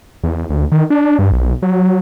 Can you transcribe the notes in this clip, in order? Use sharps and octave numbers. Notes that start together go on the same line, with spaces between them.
E2
D2
D#3
D4
G2
B1
F#3